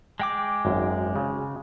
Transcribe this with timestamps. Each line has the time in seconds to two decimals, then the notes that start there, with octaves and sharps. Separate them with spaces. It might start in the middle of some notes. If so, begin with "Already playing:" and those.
0.20 G#3 G5 D6
0.65 G#1 F#2
1.16 C#3